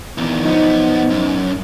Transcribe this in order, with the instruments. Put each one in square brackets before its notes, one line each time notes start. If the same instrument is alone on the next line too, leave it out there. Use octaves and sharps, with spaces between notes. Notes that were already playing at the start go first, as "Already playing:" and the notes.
[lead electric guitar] E2 D#3
[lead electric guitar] B1 B3 [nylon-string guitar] F3 D#4
[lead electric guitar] F#2